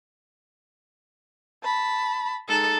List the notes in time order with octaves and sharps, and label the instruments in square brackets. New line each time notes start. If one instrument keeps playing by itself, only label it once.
[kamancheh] A5 B5
[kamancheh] G#3 D#4 [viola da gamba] A4